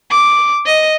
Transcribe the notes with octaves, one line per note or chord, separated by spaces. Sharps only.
D6
D#5